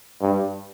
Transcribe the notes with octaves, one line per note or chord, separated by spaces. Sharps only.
G2